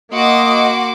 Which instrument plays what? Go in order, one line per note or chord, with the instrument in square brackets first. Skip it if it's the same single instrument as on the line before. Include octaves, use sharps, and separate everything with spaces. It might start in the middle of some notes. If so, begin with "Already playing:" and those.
[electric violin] A#3 C6 [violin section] F#4 D6 [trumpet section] D#5